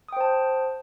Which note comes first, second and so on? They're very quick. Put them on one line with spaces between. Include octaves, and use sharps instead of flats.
D#6 G5 C5 A5